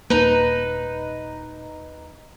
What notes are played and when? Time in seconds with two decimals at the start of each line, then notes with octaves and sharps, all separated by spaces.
0.10 D#1 A#3 D#4 B4